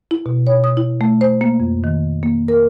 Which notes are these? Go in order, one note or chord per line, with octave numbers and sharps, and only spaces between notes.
E4
B2
C#5
D#6
E4
A3
C5
A#3
F2
D#3
A#3
A#4